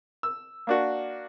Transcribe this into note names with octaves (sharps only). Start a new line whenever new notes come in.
E6
A#3 D4 F#4